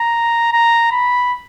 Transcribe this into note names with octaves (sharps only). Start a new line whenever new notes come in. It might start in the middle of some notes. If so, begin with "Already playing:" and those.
Already playing: A#5
A#5
B5